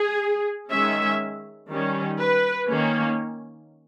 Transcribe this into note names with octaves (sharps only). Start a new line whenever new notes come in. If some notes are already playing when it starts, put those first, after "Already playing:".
Already playing: G#4
D#3 G#3 C#4 E5
D#3 G3 C#4
B4
D#3 A#3 C#4